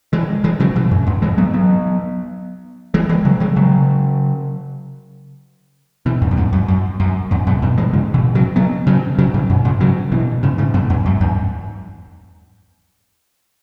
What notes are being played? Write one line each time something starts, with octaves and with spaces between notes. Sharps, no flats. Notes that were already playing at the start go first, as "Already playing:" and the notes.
E3 G#3
E3 G#3
C#3 F#3
B2 E3
F#2
E2 G#2
E3 G#3
F#3 B3
F#3 B3
E3 G#3
E3 G#3
C#3 F#3
E3 G#3
C#3 F#3
B2 E3
E2 G#2
F#2
E2 G#2
F#2
F#2
F#2
E2 G#2
F#2 B2
F#2 B2
E3 G#3
G#2 C#3
B2 E3
C#3 F#3
F#3 B3
C#3 F#3
C#3 F#3
G#2 C#3
F#2 B2
G#2 C#3
C#3 F#3
B2 E3
G#2 C#3
G#2 C#3
F#2 B2
E2 G#2
F#2
E2 G#2